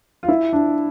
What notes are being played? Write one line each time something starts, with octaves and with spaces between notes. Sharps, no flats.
F4
E4
D4